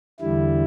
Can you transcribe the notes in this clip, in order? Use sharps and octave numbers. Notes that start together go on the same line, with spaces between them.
E2 D3 G3 E4